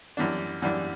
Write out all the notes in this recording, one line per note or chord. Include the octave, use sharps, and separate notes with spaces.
F#2 E3 G3 D4
F#2 E3 G3 D4